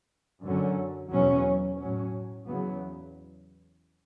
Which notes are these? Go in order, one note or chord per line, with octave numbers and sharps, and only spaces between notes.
F#2 D3 F#3 C#4
E2 B2 F#3 C#4
A2 F#3 C#4
E2 C#3 F#3 B3